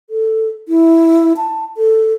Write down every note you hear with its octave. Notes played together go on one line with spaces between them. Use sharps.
A4
E4
A5
A4